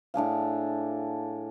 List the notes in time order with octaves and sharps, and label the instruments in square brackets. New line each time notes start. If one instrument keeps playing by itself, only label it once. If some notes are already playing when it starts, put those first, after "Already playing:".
[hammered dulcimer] A2 D4 G#4 F5